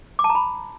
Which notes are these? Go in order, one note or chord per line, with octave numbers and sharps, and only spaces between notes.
D6
A5
A#5
B5